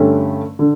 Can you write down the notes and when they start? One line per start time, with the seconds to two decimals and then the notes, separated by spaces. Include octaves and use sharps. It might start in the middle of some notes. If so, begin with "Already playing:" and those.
Already playing: G2 D3 A3 C#4 G4
0.59 D3